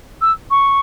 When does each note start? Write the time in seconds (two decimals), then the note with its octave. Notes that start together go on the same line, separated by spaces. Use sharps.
0.22 E6
0.51 C#6